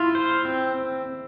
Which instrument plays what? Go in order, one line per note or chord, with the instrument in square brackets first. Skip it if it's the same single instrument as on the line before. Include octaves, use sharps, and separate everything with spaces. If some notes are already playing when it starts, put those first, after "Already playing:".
Already playing: [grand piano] E4 [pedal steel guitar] F4
[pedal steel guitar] C5
C4